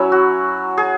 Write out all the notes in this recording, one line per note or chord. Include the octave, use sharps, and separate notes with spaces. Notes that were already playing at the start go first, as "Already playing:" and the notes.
Already playing: F#3 C#4 E4
F#4
G#4